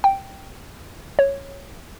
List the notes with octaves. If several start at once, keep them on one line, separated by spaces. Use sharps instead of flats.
G5
C#5